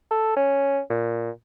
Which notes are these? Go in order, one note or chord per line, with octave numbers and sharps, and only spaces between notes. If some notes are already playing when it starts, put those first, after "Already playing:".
A4
C#4
A#2